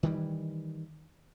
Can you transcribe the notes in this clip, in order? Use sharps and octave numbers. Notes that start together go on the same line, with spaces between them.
D#3 E3 G3